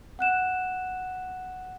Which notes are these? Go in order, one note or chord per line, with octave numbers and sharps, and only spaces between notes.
F#5 F#6 E7